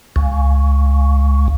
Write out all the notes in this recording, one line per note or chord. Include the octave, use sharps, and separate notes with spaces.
C#2